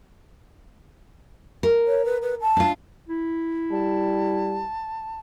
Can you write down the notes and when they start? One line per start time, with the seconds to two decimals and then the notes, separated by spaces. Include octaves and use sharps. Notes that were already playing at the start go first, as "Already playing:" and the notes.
1.63 A#4
1.87 C#5
2.05 B4
2.22 B4
2.41 A5
2.57 D4 F4
3.08 E4
3.71 G3 A5